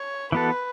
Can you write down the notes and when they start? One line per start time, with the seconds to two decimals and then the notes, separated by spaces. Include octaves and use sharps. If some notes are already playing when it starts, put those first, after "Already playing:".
Already playing: C#5
0.32 E3 B3 F#4 A4 B4